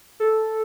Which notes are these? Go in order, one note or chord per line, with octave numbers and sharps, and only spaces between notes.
A4